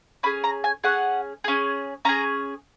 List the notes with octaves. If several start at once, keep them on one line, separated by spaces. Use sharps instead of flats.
C#4 G#4 B5
A#5
G#5
C#4 G#4 F#5
C#4 G#4
C#4 G#4 A#5